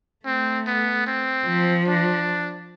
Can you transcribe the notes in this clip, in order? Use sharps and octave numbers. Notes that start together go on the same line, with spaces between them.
A3 C4
B3
C4
F3
D4